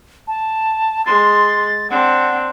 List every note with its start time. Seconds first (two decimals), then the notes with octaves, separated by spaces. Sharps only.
0.28 A5
1.06 G#3 C6 A6
1.90 C4 D4 F#5